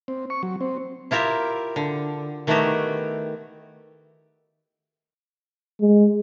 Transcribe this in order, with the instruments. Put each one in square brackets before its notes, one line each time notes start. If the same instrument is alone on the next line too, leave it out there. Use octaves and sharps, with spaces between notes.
[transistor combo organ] C4
C#6
F#3
C4
[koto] E4 F4 G4 A#4 E5
D3
D#3 A3 B3 E4 F#4 G4
[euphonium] G#3